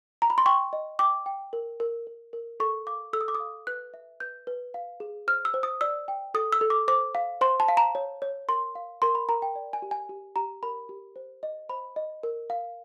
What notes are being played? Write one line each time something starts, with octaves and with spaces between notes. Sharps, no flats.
A#5
B5
C6
G5 C#6
D#5
G5 D6
G5
A#4
A#4
A#4
A#4
A4 C#6
F5 D6
A4 E6
D#6
D6
D#6
F5
B4 F#6
E5
B4 G6
B4
F5
G#4
C5 F6
E6
C5
D#6
D5 E6
G5
A4 D#6
E6
A4
D6
C5 D6
F5
C5 C6
A5
F5
A#5
C#5
C#5
A#4 C6
F5
A#4 C6
B5
A#4 A#5
G5
D5
G#5
G4
G#5
G4
G4 A#5
A#4 B5
G4
C5
D#5
C5 B5
D#5
A#4
F5